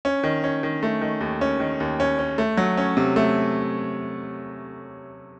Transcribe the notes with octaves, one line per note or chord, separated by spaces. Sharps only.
C#4
D#3
C#4
D#3
A3
D#3
D#2
C#4
D#3
D#2
C#4
C#4
A3
F#3
C#4
C3
A3